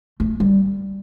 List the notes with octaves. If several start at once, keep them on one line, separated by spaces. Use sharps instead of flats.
A3
G3